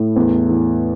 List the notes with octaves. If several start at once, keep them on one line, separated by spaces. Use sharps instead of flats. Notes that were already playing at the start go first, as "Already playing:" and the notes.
Already playing: A2
E2
E3